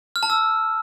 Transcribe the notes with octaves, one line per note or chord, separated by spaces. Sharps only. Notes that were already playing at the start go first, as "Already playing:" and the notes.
F6
A5
E6